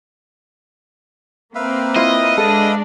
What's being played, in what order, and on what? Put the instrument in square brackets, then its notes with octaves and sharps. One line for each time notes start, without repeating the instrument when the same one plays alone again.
[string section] A#3 C4 [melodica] B4 E5 F5
[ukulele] E4 F4 C5 [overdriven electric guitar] D#5
[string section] G#3 D4 [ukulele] A4